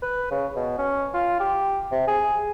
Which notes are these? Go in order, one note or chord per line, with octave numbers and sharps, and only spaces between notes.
B4
C#3
B2
C#4
F4
G4
C3
G#4